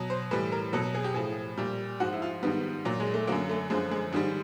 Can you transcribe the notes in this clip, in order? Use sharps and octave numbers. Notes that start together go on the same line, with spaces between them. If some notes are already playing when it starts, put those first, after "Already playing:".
Already playing: B2 F#3
C5
A2 E3 G3 B4
A#4
B2 F#3 A4
G#4
G4
A2 F3 G#4
A#2 G3
G#2 F3 F#4
E4
F4
G#2 D#3 G3 B3
A#2 F#3
G#3
A3
F#2 D3 F#3 A#3
A3
F#2 D3 F3 G#3
G#3
G#2 D#3 G3 G#3